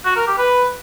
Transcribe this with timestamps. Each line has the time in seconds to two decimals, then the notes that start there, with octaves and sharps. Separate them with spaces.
0.05 F#4
0.16 A#4
0.27 G4
0.38 B4